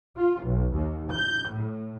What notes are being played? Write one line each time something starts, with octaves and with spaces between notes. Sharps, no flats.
F4
B1
D#2
G6
A2